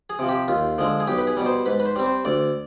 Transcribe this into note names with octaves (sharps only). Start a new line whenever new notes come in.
G#4
C3 F3
G4
D#2 F4
D3 F3 G#3
G#4
B1 G4
B4
G#4
B2 G3
C5
G#2 B4
B4
C5
G3 C4
C5
D2 D5